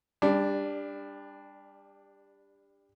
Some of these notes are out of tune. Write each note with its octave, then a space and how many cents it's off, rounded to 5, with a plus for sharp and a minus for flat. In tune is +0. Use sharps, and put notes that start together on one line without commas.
G3 +25 D4 +0